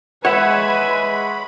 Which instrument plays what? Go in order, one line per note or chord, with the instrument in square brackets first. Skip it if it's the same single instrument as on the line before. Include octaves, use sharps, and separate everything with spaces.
[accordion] G#3 B5 [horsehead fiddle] B4 G#5 [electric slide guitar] C#5 E5 [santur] F#5